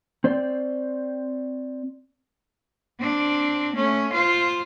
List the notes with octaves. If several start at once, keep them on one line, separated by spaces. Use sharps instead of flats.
C4 C5 D5
C4 D4
A3 C#4
F4 C5